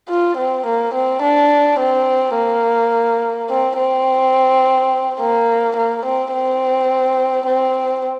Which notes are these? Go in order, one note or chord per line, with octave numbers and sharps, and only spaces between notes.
F4
C4
A#3
C4
D4
C4
A#3
C4
C4
A#3
A#3
C4
C4
C4